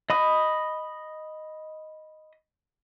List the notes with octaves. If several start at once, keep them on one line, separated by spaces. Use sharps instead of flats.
D#5 B5 D#6